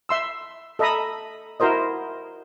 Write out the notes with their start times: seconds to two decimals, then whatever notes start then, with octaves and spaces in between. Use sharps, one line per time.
0.09 E5 C6 E6
0.79 A4 D#5 E5 A#5 B5 D#6
1.60 E4 F#4 A#4 C5 D#5